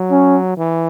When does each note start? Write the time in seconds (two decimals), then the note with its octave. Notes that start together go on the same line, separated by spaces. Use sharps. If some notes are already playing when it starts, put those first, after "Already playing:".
Already playing: F#3
0.11 C#4
0.57 E3